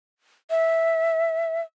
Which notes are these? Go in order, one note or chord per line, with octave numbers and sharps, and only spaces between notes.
E5